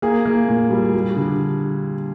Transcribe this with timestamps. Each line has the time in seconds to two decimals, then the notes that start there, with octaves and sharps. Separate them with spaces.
0.02 A#3 G#4
0.25 A#3
0.49 A#2
0.71 G3
0.93 G3
1.16 D3